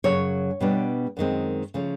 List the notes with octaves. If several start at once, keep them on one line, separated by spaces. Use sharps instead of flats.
F#2 C#3 F#3 C#5
B2 G3 B3 D4
F#2 D#3 G#3 C4
C#3 F3 A3 C#4